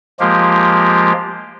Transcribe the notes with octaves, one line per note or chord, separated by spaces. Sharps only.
F3 G#3 A#3 F4 G4